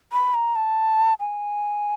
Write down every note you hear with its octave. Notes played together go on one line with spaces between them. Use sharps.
B5
A#5
A5
G#5